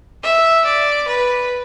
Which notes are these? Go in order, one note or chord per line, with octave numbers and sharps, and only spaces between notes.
E5
D5
B4